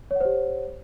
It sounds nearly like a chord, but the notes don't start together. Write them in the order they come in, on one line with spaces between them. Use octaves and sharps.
C#5 F#5 C5 G4